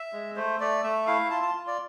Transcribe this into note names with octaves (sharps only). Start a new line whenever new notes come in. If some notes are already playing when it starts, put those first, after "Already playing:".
Already playing: E5
G#3
A3 C5
A3 D5
A3 E5
E4 F5
F4 A5
A5
F4
D5